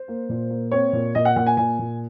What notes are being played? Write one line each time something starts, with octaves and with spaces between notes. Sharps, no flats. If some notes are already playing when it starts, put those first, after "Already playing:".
Already playing: C5
A#3
A#2
A#3
C4 C#5
A#2
A#2 D#5
F#5
A#2 F#5
G#5
A#2 G#5
A#2